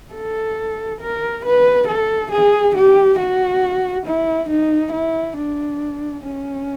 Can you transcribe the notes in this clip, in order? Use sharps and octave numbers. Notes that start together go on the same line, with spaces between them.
A4
A#4
B4
A4
G#4
G4
F#4
E4
D#4
E4
D4
C#4